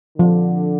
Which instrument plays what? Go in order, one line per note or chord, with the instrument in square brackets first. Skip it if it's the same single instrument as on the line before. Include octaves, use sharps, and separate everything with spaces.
[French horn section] D3 [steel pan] F3